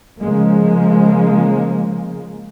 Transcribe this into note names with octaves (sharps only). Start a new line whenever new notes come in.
C#3 F3 G#3 A#3